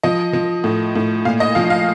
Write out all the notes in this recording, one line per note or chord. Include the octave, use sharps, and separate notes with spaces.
F3 D#5
F3
A2
A2
A#2 F5
D#5
F3 F5
F5